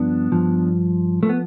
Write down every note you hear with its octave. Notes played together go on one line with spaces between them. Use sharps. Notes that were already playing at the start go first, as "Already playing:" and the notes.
Already playing: G2 F3 B3 D4
G2 F3
F3 A3
B3